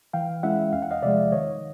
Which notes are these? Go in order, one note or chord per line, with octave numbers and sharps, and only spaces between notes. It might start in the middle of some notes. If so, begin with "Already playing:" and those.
E3 F5 G5
G#3 C#4 E4 E5 F#5
E2 F5
F#5
D#5 F5
C3 F3 G#3 D5 E5
D#3 C#5 D#5